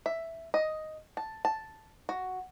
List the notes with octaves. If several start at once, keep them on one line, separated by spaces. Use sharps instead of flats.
E5
D#5
A5
A5
F#4